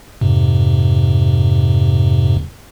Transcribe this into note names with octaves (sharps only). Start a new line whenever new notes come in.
F2 G#2 C3